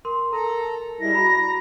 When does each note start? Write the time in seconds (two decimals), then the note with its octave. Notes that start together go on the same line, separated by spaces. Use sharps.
0.05 A#4 C6
0.33 A4 A#4 A#5
1.01 G3 G#3 E4 A#6
1.13 F#4 A#5 B5